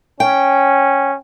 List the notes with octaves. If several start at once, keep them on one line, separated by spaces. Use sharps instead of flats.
C#4 G5